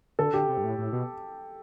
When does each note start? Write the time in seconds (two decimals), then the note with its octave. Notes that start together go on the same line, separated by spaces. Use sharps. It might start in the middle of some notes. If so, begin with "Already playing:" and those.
0.19 D3 A4
0.33 D3 G4
0.49 C3
0.58 G2
0.64 A2
0.78 A2
0.93 B2